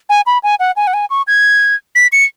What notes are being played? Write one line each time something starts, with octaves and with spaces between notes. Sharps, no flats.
G#5
B5
G#5
F#5
G#5
F#5
G#5
C#6
G#6
B6
C#7